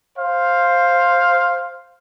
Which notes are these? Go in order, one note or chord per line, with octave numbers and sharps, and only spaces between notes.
C5 F5